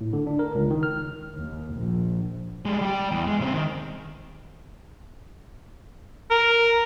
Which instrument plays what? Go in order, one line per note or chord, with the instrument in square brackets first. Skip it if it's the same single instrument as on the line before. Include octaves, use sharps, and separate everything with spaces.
[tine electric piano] A2
D3
D4
A#4
C#2
D#3
F6
[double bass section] D#2
A#1
[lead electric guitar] G3 G#3
G3 G4
E2
G#3
C#3 C4
D#3
[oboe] A#4